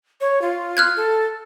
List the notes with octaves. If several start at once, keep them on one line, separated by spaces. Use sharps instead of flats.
C#5
F4
F6 F#6 G#6
A4